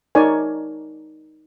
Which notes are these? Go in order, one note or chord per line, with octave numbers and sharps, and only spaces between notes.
D#4 A#4 C#5 D5 G#5